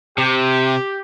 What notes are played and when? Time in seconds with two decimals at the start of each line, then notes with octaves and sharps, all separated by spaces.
0.18 C3 G4